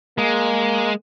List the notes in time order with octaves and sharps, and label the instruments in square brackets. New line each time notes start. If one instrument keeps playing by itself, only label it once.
[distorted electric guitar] G#3 [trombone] A#3